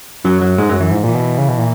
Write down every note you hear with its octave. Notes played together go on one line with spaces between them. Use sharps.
F#2 F#3
F#3
G#2 G#3
F#2 F#3
F#2 E3
G#2
A#2 E3
B2
C#3
B2
A#2